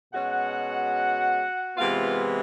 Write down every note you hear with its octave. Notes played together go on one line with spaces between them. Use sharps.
B2 G#3 C#4 F#4 F#5
C3 E3 G#3 B3 F4 F5